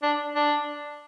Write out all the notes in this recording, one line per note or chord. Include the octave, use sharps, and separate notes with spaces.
D4
D4